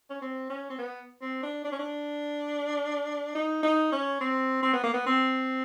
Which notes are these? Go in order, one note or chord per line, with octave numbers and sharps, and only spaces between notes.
C#4
C4
C#4
C4
B3
C4
D4
D4
C#4
D4
D#4
D#4
C#4
C4
C4
B3
A#3
B3
C4